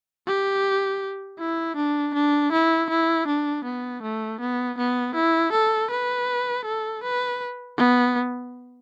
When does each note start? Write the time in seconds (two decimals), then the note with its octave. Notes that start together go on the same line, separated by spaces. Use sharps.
0.27 G4
1.39 E4
1.76 D4
2.14 D4
2.52 E4
2.90 E4
3.27 D4
3.64 B3
4.02 A3
4.40 B3
4.78 B3
5.15 E4
5.52 A4
5.90 B4
6.65 A4
7.04 B4
7.78 B3